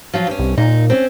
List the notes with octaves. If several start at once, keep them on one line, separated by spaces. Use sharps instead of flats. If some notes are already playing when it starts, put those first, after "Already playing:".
F3 F#3 F4
G2 C#4
C2
A#2 D#4
C4 C#4